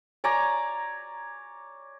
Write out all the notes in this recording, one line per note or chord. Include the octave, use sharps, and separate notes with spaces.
C#5 D5 G#5 A#5